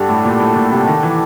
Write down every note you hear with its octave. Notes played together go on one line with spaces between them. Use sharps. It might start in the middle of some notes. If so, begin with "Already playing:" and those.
Already playing: G2 D4 F#4 A4 D5 G5
A2
A#2
A2
A#2
C3
D#3
E3